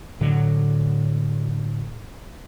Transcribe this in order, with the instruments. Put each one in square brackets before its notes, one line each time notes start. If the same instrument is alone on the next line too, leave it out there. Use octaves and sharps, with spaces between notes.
[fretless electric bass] A2 D3 F#3